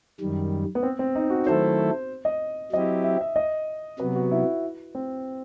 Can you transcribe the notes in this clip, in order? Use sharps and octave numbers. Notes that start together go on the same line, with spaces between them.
F#2 D#3 G3
B3
C4
C4
D#4
F#4
D#3 F#3 A3 E4 A4 C5
D#5
F#3 C4 E4 G4 D#5
E5
E5
D#5
C3 F#3 B3 B4
F#4
E4
C4